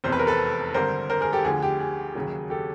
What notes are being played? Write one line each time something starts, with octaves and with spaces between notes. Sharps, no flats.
F1 E2 C3 C5
B4
A#4
A4 B4
G#1 G2 D3 A#4 C5
A#4 C5
G#4 A#4
G4 A4
D2 D3 F3 G#4
G4
G#4
D#2 C#3 F#3
G4 A4